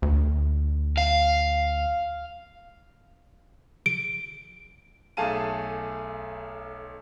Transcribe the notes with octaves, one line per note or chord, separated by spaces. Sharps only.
D2
F5
D7
B1 A3 G#4 F5 A5 D#7